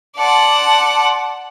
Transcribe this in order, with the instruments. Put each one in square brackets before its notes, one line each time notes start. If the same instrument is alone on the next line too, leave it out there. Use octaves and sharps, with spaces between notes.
[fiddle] D5 F#5 [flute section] A5 C6